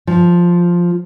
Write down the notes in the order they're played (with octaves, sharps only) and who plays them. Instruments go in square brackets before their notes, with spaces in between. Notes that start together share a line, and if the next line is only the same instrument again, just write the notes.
[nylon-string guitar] F3